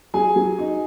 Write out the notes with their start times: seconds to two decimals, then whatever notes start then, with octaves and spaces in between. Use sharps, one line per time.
0.14 F#3 G#4 G#5
0.36 F#3
0.58 D#4